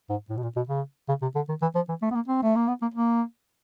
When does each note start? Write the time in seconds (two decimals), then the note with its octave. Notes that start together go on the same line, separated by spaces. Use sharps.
0.10 G#2
0.30 A2
0.37 B2
0.43 A#2
0.56 B2
0.69 C#3
1.08 C#3
1.22 C3
1.35 D3
1.49 D#3
1.62 E3
1.75 F3
1.89 E3
2.02 A3
2.11 B3
2.15 A#3
2.28 C4
2.43 A3
2.56 A#3
2.68 B3
2.82 A#3
2.94 A#3